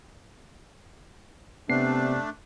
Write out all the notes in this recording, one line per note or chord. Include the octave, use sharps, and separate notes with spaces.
C3 A3 B3 D4 C7